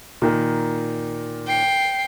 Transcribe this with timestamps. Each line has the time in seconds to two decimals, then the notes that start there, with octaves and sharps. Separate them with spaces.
0.22 A#2 D#3
1.47 G5 C7